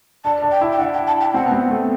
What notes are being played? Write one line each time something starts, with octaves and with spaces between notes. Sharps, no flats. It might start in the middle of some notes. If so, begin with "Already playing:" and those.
D4 A5
D4
G5
E4
G5
D4 F#5
G5
A5
G5
C4 F#5
B3
C4
A3